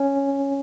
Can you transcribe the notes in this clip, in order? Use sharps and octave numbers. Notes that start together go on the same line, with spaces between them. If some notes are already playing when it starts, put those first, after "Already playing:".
Already playing: C#4